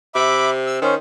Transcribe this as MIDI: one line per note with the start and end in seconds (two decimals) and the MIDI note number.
0.15 0.80 48
0.15 0.50 76
0.15 0.50 83
0.15 0.50 86
0.67 0.78 88
0.82 0.97 51
0.82 0.94 61
0.82 0.94 72